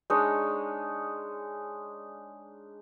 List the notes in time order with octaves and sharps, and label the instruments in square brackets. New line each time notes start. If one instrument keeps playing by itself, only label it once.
[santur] G#3 D4 D#4 C#5